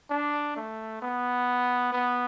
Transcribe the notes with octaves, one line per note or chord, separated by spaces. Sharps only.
D4
A3
B3
B3